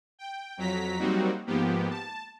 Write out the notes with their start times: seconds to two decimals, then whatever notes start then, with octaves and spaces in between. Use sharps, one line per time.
0.19 G5
0.57 F2 F#3 A#5 B6
0.99 F#3 G3 A#3 C4 D#4 F#4
1.47 G#2 F3 A#3 B3 G4
1.90 A5